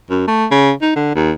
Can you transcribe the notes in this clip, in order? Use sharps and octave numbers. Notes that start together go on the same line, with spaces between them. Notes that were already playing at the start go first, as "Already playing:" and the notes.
F#2
A3
C#3
D#4
D3
D#2